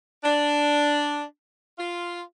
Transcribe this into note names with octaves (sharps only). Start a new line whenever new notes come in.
D4
F4